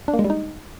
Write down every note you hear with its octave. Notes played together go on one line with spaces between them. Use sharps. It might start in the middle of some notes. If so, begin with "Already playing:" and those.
D4
A#3
G#3
G3
D#4